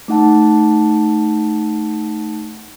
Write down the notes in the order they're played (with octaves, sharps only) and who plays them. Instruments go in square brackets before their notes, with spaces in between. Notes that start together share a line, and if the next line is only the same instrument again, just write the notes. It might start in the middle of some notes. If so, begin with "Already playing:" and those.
[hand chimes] A3 D#4 F#5 A5